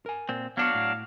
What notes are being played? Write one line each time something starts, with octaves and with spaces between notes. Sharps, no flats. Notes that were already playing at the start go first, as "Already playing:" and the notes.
A#4 G#5
A#2 C4
F#3 B3 D4 F#4 F5
A2